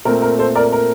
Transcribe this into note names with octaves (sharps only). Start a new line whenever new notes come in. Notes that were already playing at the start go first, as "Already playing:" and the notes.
A#2 A3 C4 A#4
A#4
A4 C5
A#4 D5
A#4